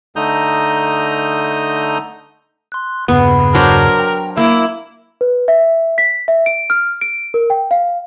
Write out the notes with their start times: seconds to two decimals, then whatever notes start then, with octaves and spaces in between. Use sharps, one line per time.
0.16 D3 A3 D#4 A#5 D#6 G6
2.72 C6 F#6
3.08 E2 G2 C#3 B3
3.55 F#3 D4 A#4 C5
3.99 G5
4.37 A#3 E4 E6
5.21 B4
5.48 E5
5.98 B6
6.28 E5
6.46 D7
6.70 F6
7.01 D7
7.34 A#4
7.50 G5
7.71 F5